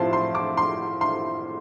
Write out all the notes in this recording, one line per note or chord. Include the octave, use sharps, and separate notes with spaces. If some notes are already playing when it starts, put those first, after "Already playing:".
Already playing: A2 F3 C4 F4 A5 C6
C6
D6
C6
C6